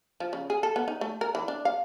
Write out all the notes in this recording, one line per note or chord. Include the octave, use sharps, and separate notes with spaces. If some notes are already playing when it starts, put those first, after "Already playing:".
F3
C#3
G#4
A4
B3
D#4
A3
A#4
E3
D4
F5